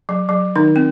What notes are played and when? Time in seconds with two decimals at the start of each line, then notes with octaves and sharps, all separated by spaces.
0.09 F#3
0.29 F#3
0.56 D#3 D#4
0.76 C4